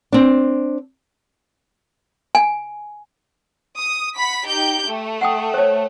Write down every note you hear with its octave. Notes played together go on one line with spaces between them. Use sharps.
C4 D4
G#5
D#6
F#5 B5 B6
D#4 G4 G6
A3
F#5 G5 D#6
C5 C#5